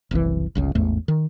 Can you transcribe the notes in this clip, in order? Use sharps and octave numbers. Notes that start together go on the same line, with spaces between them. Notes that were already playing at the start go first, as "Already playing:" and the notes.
F#1 C2 B2 E3
G1 C#2 C#3
A1 E2 G#2 A3
D#3